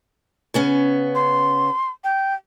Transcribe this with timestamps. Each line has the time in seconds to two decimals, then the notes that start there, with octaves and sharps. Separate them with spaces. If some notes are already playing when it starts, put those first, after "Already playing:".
0.54 C#3 B3 C#4
1.15 C6
2.04 G5